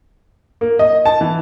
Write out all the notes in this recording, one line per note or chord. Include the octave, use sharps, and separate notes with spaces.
A#3
D#5
A5
E3